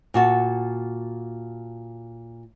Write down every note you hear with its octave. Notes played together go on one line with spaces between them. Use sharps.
A#2 F#4 A5